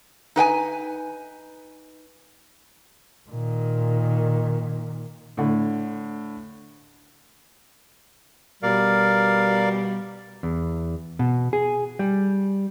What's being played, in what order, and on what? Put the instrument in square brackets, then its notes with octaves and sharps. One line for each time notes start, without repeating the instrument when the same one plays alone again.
[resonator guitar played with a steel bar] D#4 B4 G5 G#5
[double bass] A#2 D#3
[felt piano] A2 D3
[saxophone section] B2 G3 [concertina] A#4 D5 F5
[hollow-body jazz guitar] E2
B2
G#4
G3